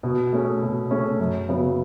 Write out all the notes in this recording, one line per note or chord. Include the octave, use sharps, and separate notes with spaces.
B2
A3 C#4 G#4
B2
A3 C#4 G#4
F#2
C#3 F#3 B3